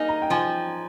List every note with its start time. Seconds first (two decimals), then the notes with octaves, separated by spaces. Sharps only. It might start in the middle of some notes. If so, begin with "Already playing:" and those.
Already playing: A#3 D#4 G#5
0.09 A#5
0.22 G5
0.30 F3 G#5